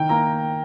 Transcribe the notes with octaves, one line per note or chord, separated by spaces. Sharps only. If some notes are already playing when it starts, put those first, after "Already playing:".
Already playing: D#3 G5
A#3 A#5